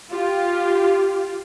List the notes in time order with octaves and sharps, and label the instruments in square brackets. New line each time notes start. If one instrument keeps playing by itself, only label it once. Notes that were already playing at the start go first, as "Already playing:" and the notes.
[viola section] F4 G4